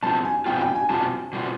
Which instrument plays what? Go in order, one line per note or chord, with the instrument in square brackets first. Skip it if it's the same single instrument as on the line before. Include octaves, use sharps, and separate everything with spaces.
[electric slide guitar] B2 G3 C4 F4 [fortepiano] A5
[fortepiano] G#5
[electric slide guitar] B2 G3 C4 F4 [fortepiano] G5
[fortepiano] G5
G#5
[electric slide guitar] B2 G3 C4 F4 [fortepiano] A5
[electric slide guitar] B2 G3 C4 F4